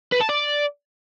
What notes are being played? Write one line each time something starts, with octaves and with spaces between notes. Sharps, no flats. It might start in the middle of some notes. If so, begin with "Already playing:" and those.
B4
A5
D5